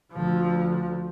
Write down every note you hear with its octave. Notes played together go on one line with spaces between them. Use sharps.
D2 F3